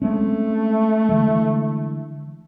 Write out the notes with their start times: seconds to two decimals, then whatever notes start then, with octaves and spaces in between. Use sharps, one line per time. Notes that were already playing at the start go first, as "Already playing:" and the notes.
0.02 G#3 A3 C4 C#4
1.09 D3 E3 G#3